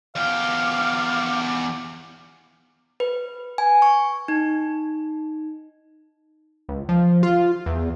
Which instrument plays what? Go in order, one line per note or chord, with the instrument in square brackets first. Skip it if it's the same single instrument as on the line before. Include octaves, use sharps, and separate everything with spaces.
[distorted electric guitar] E2 G4 [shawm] F5
[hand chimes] B4
G#5
C#6
D#4
[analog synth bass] C#2
F3
F4
E2